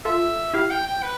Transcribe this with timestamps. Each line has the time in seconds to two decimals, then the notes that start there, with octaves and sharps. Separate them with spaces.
0.05 F4 A4 E5
0.53 E4 G4 F5
0.71 G5
0.87 G5
1.03 B4